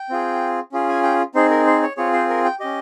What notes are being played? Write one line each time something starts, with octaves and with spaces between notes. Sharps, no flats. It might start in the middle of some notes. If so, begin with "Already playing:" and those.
Already playing: G5
C4 F4 G#4
C#4 F4 G#4
G#5
G5
C4 D#4 G#4 C5
A#4
C5
C#5
C4 F4 G#4 C#5
C5
A#4
G5
C#4 G4 D#5